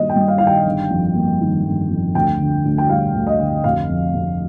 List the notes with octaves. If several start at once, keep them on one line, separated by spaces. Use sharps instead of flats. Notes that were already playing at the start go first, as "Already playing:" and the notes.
Already playing: G2 D#3 G3 A#3 D#5
G5
G2
F5
D#3 F5
G5
G1
F2
A#3
D#3
G1
F2
D2 G5
D3
D2
G5
G3 F5
D2
D#5
D3
F1 F5
F2
F1